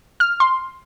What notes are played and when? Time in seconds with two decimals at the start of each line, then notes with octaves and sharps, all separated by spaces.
0.20 F6
0.40 C6